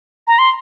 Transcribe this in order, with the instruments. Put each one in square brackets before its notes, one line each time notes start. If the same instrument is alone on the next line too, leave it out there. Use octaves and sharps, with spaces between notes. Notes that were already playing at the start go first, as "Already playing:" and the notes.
[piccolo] A#5
C6